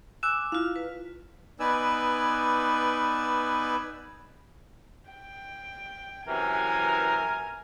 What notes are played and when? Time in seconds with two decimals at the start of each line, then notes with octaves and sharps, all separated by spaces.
0.23 G#5 D6 E6 F#6 E7
0.52 E4 F4 F5
0.76 B4
1.60 B3 D#4 B4 D5 G#5 E6
5.10 G5
6.28 F#2 C3 E3 A#4 G#5